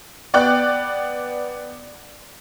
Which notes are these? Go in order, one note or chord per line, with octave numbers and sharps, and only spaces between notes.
B3 D5 G5 F#6